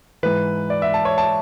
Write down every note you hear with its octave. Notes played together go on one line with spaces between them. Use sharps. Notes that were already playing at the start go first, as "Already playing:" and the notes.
G#2 E3 B4
D5
E5
A5
C#5
A5